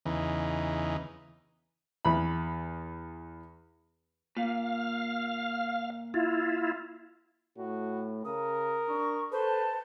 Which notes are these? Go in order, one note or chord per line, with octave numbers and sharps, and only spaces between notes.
E2 C#3 E3 D#4
E2 B5
A#2 F5
E4 F4
A2 F#4
C#3 A#4 D#6
D4 C#6
A4 B4 C5 A5